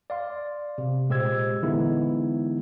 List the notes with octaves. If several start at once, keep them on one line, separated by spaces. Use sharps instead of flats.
D5 F5 C6
C3
A#2 G#3 G4 C5 E6 G#6
D3 E3 G#3 B3 D#4 E4